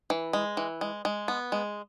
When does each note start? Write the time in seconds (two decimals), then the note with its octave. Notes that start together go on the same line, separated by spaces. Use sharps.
0.10 E3
0.33 G#3
0.57 E3
0.81 G#3
1.05 G#3
1.28 B3
1.52 G#3